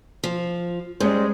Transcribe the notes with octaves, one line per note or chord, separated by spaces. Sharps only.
F3
G#2 G3 G#3 C#4 C5